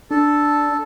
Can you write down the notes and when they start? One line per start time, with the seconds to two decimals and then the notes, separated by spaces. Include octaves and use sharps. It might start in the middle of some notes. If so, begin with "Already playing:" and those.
0.11 D4 A4